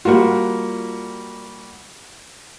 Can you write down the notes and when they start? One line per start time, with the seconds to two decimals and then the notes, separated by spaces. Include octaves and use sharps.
0.05 G3 A#3 F4 F#4 F#5